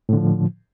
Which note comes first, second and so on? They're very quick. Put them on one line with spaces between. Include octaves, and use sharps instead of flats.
A2 D3 F3